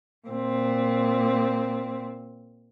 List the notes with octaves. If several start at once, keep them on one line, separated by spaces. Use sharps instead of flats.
A#2 C4